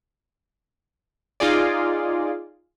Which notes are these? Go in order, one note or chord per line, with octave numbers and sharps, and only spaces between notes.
D#4 F4 G#4 D5